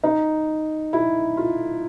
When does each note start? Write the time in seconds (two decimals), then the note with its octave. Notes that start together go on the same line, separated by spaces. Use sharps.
0.03 D#4
0.93 E4
1.37 F4